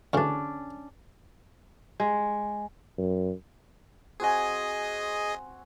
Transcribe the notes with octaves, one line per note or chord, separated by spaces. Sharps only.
D2 C#3 E3 C#4 D4
G#3
F#2
C4 F#4 G#4 D#5 G#5